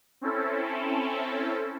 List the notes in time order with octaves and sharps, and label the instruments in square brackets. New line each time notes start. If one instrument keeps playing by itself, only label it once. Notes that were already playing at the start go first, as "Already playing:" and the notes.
[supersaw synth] C4 C#4 E4 A4